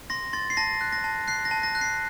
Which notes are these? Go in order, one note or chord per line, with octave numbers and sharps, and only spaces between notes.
C6 A#6
C6 A6
C7
A5 A#6
F#6
A#6
A5
F#6 C7
A#6
A5
A#6
F#6
C7